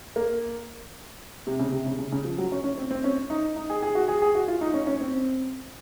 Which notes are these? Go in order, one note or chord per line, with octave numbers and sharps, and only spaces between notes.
A#3
C3
C#3
C3
C#3
C#3
C#3
F3
F#3
C#4
C#4
C4
C4
C#4
D#4
D#4
G#4
G#4
F#4
G#4
G#4
F#4
F4
D#4
C#4
C#4
C4